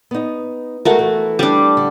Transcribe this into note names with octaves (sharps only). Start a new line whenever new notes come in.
B3 D#4
G#3 A3 F#4 A#4
E3
G3 D4
D3